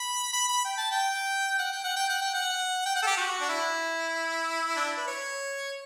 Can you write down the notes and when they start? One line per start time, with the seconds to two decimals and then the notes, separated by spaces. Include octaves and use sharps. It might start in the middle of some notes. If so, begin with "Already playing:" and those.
Already playing: B5
0.33 B5
0.49 B5
0.65 G5
0.77 A5
0.92 G5
1.59 F#5
1.72 G5
1.84 F#5
1.96 G5
2.09 F#5
2.22 G5
2.34 F#5
2.86 G5
2.96 F#5
3.02 A4
3.07 G4
3.17 F#4
3.41 D4
3.49 E4
4.76 D4
4.86 E4
4.97 B4
5.07 C#5